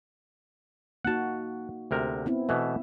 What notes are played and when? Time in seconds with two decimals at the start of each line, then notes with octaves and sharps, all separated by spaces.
1.05 A#3 D#4 F#4 F#5 A5
1.91 D2 C3 A#4
2.26 B3 C4 E4
2.49 B2 E3 A3 E5